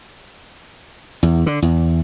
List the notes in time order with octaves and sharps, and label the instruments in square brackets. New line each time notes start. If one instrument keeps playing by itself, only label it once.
[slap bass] E2
D3
E2